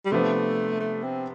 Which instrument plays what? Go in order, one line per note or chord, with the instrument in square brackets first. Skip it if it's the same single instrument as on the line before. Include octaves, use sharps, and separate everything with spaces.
[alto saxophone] G3
[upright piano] C3 F3 B3 D4 [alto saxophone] A3
[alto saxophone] A3
C4